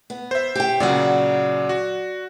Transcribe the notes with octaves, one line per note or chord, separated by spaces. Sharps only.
B3
C5 E5
G4 G5
A#2 C#3 F#3 D5 F#5
F#4